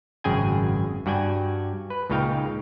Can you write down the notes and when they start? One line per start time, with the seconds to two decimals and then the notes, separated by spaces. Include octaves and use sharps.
0.24 G#1 F#2 C#3 G#4 G5 G#5
1.06 G2 F#4 D5 G5 G#5
1.90 B4
2.10 C#2 A#2 C#3 D#4 F5 G5